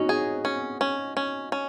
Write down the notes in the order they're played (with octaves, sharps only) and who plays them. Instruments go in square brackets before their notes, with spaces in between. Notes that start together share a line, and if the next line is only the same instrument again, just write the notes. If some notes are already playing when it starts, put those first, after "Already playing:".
Already playing: [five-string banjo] C#4 [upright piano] D#4 F#4
[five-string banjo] G#4
C#4
C#4
C#4
C#4